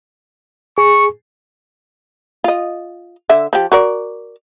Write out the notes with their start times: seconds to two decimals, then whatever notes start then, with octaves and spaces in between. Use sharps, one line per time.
0.78 G#4 C#6
2.44 F4 D#5
3.29 D3 E5
3.53 F3 G4
3.72 F#4 A#4 D5